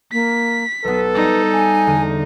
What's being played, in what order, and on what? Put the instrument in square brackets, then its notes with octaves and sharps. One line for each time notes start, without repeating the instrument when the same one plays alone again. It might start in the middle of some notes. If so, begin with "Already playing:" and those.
[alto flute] A#3 [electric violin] B6
[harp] B1 B3 [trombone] A4 [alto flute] B4
[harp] G3 C5 D5 [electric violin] D#4
[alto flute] G#5
[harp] E2 D3